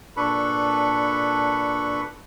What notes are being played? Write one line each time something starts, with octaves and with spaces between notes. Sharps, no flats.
A#2 D4 A4 B4 B5 C#6